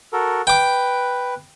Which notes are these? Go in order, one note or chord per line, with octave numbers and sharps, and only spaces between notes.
F#4 A4 A#4
B4 G5 D6